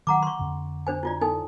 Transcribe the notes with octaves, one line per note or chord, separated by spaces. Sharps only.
D#3 F#3 F#5 A#5 D6
C6 C#6
F2 D3
D4 C5 G#5
E4 F4 D5
D#4 A4 G#5